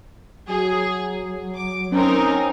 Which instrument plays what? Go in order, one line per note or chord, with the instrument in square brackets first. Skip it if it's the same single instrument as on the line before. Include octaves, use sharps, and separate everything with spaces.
[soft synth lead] F#3 [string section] G#4
[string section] D6
[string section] C4 D#4 A#4 [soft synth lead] C#4